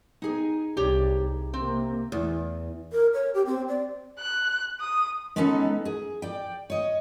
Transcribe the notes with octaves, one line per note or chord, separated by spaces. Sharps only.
D#4 G#4 G#5
C2 G4 C#5 D5
C3 A#3 C4
E2
A#4
C#5
G4
C4
D5
F#6
D#6
G#3 B3 C#4 D#4 G#4 A4
G#4
D5 G5
C#5 D#5